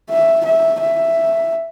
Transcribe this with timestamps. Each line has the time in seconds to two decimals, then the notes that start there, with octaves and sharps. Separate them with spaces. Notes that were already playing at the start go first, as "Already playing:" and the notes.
0.10 E5
0.45 E5
0.80 E5